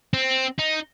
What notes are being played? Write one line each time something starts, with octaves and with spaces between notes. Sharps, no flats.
C4
D#4